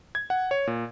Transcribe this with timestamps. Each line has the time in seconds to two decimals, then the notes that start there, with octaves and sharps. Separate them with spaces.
0.15 G#6
0.30 F#5
0.51 C#5
0.67 A#2